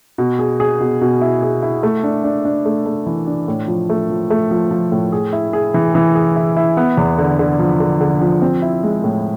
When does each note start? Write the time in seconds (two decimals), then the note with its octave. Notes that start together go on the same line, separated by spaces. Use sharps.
0.18 B2
0.39 G#4
0.60 G#4
0.80 B2
1.01 B2
1.21 E4
1.42 G#4
1.63 E4
1.83 A3
2.03 D4
2.24 D4
2.45 D4
2.65 A3
2.86 A3
3.06 E3
3.27 D4
3.48 A2
3.68 F3
3.90 A3
4.10 F3
4.30 A3
4.51 F3
4.71 F3
4.92 A2
5.12 G#4
5.33 E4
5.53 G#4
5.74 E3
5.95 E3
6.15 G#4
6.36 E4
6.57 E4
6.77 B3
6.97 E2
7.18 D3
7.39 D3
7.59 F3
7.80 D3
8.00 D3
8.21 F3
8.42 C4
8.62 E4
8.83 G#3
9.04 A2